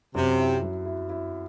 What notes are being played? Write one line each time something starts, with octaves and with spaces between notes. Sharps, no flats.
F#2 C3
E4
F#3
E4
E4